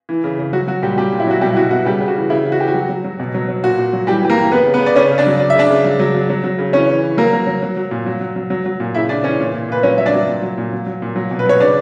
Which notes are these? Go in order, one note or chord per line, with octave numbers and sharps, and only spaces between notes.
E3
C#3
C#3
F#3 F#4
F#3 F#4
A#2 G3 G4
F#3 G3 G4
A#2
E4
F#3 F#4
B2 G3 G4
E4
B2 F#4
B2 F#4
C#3 G3 G4
C#3
F#4
E3
C#3 E4
E3
F#4
E3 G4
F#4
F#3
F#3
F#3
B2
F#3
F#3
A#2 F#4
A#2
F#3
E3 G3 G4
E3 G4
A#3 A#4
E3
C#3 B3 B4
C#3
B3 B4
C#3
D5
C#3 C#4 C#5
C#3
D4 D5
F#3
C#3 D5
E5
C#3 D4 D5
C#3
F#3
F#3
F#3
F#3
F#3
C#3
E3 C#4 C#5
E3
E3
F#3 A#3 A#4
F#3
F#3
F#3
F#3
A#2
F#3
F#3
F#3
F#3
F#3
A#2
C#3 E4 E5
C#3 D4 D5
E3 C#4 C#5
A#2
A#2
A#2 B4
F#3 C#4 C#5
F#3 E5
D4 D5
F#3
A#2
F#3
A#2
F#3
F#3
A#2
F#3
B2
B4
F#3 C#5
C#3 D4 D5